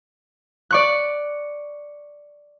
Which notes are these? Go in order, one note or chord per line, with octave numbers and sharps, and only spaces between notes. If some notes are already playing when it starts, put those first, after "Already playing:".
D5 C#6 F#6